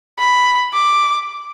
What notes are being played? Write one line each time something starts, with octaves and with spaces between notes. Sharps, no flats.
B5
D6